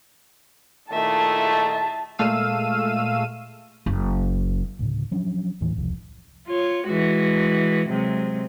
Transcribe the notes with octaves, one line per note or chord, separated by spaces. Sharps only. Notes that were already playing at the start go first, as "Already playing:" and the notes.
A#2 D#3 A3 E4 G#4 E5 A5
A#2 G#3 A3 F5 E6 D#7
F#1
D2 A2 C#3
F3 F#3 C#4 D4
D#2 A2 E3
E1 C2 F3
F4 C#5
E3 G#3 F#4
C3 F#3 G#3